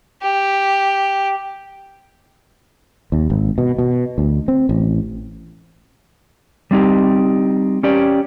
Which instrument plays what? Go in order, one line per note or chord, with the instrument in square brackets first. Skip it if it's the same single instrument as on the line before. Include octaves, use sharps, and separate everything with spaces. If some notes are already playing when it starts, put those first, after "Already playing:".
[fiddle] G4
[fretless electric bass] D#2
G#1
B2
B2
D2
C4
A1
[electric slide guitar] G3 C4 D#4 G4
C#4 G4 D5